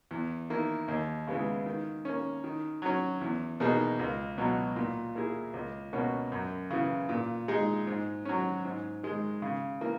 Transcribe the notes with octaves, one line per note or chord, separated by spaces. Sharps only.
E2
D#3 A#3 E4
D#2
C#3 G#3 B3 E4
D#3
A#3 C#4
D#3
F#3 C#4
E2
B2 A#3 D#4 G#4
C#2
B2 F#3
A#2
A#3 E4 G#4
C#2
B2 A#3 C#4 F#4
F#2
C#3 E3
A#2
G#3 D#4 G#4
G#2
F#3 C#4
G#2
D#3 G#3
C#3
E3 A#3